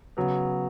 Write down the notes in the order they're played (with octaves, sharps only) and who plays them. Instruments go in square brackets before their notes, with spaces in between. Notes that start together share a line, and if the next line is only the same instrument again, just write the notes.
[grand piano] C#3 F#3 B3